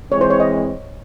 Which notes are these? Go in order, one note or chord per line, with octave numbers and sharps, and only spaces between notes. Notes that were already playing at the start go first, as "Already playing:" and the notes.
E3 G#3 C4 C#5
C5
C#5
D#5